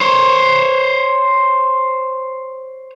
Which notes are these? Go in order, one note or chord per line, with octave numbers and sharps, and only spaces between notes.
C5 C#5